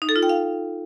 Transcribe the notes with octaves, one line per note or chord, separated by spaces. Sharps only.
D#4
A4
F4
G5
F5